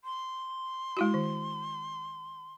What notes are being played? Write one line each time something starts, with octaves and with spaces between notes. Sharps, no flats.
C6
G#3 E4 F#4
D#3